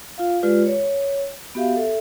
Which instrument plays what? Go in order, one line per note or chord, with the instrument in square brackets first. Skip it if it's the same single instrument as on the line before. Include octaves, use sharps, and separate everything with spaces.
[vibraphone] F4 F5
G#3 F4 G4 B4 D5
C#5
B3 F#4 G4 E5 F5
A4 E5